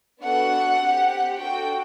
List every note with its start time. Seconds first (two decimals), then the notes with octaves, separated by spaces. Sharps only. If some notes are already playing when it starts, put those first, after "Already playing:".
0.21 B3 D4 F#4 A4 F#5
0.80 C4 G4
1.09 F#5
1.38 D4 F#4 A4 G5